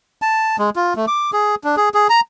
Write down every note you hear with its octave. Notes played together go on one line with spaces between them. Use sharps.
A5
G#3
F4
A3
D6
G#4
D4
G#4
G#4
A#5